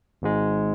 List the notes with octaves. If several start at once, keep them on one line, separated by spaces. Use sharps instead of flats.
G#1 G#2 G#3